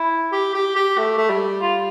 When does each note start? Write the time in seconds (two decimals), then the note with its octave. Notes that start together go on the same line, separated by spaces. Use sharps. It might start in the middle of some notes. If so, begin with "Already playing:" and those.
Already playing: E4
0.32 G4
0.54 G4
0.76 G4
0.98 A3
1.17 A3
1.30 G3
1.61 F4